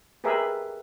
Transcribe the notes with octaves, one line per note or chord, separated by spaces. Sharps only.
G4 G#4 A#4 B4 E5